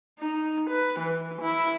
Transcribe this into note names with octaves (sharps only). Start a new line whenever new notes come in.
D#4
B4
E3
E4